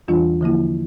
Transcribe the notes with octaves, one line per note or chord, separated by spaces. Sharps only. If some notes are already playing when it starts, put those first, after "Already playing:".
E2 E3 G3 D4 F4
D3 F3 A#3 E4